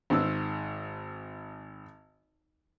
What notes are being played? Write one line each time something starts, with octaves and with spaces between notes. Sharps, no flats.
G#1 G#2 E6